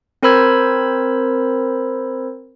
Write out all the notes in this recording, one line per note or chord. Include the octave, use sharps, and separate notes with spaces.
C4 A#4 C5 B5 E6 G#6